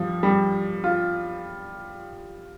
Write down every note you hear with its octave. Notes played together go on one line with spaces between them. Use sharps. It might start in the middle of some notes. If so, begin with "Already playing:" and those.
Already playing: F3 G3
G3
F4